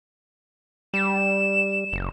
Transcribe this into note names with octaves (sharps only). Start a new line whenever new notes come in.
G3 E7
F#1